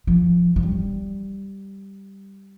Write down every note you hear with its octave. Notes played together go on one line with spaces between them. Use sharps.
F3
F3
G3